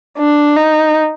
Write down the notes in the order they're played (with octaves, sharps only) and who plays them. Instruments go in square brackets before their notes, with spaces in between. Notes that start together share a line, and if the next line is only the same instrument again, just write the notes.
[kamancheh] D4
D#4